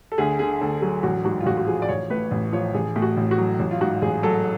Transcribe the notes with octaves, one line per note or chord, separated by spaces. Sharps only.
A4
D2 G#4
D3 G#4
D2 A4
F#3 G#4
A1 F#4
G#2 F#4
F4
A1 F#4
F#4
F3 G#4
D5
A1 C#5
A2 B4
A1
F3 C#5
A1 G#4
A2
F#4
A1
F#4
F#3
A1
F4
G#2 F#4
A1 G#4
F#3 A4